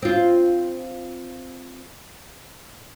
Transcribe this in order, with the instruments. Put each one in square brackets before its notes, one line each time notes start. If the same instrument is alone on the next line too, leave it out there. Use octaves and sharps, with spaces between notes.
[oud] C4 F4